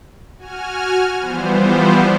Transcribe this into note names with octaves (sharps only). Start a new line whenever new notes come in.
F#4 G#5 F6
E3 F3 G3 B3 C5